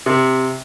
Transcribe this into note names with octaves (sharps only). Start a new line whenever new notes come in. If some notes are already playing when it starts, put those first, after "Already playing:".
C3